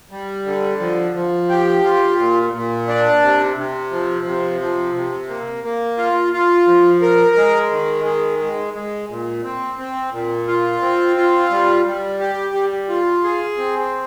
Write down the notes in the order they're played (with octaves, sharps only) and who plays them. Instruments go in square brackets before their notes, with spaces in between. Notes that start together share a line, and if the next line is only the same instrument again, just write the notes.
[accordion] G3
D3
F3
F3
G4
F4
A#2
A#2
D4
C3
C3
F3
C3
F3
C3
A#3
A#3
F4
F4
F3
A#4
G#3
D#3
G#3
G#3
G#3
A#2
C4
C4
A#2
F4
C4
F4
G3
G3
G4
G3
F4
G#4
C4